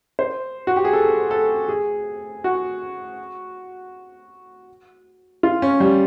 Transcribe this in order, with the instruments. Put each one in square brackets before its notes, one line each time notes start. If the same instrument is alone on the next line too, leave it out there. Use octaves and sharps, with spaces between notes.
[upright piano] C5
F#4
G4
G#4
A4
A4
G#4
F#4
F4
C#4
G3